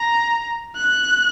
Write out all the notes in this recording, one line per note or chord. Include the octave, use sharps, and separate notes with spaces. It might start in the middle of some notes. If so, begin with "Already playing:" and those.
Already playing: A#5
F#6